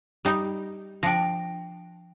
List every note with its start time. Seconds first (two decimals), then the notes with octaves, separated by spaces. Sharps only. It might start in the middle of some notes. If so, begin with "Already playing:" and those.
0.25 G3 D#4 G5
1.03 F3 D4 G5 A#6